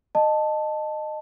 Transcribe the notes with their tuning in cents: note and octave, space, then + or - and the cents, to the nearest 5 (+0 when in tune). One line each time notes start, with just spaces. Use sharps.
D#5 -20 A5 +0